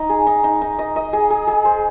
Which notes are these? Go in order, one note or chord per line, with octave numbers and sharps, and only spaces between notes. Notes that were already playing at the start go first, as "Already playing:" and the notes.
Already playing: D#4
G#4
D#4
D#4
D#4
D#5
D#5
G#4
G#4
G#4
C5